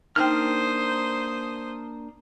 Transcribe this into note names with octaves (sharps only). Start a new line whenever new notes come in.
A#3 D4 D#4 C5 G5 D#6 F6